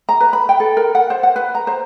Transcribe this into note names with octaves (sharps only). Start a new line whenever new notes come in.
A#5
B4
B5
G5
A4
A#4
F#5
C5
F#5
B4
A#5
C5